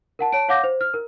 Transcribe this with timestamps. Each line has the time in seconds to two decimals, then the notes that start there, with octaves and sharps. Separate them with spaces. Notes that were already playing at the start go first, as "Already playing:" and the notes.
0.19 A#4 F#5 A5
0.32 C#5 A5 D7
0.48 C#5 F5 F#5 D6 G6 A#6
0.64 C5
0.81 F6
0.94 A#4